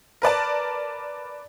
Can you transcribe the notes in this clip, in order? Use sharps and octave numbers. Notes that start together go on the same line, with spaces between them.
A#4 B4 D5 A5